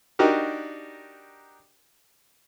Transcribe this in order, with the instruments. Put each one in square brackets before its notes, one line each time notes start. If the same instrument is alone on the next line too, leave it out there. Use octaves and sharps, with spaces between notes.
[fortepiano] D4 D#4 F#4 G4 A#4